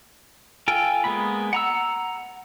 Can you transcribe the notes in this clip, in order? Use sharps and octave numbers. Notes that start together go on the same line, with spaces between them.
F4 A4 G5 G#5
G#3 A#3 B3 B5
F#5 A#5 E6